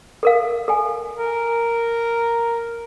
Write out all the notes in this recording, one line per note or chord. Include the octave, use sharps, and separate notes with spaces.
A4 A#4 F5
A4 G#5
A#4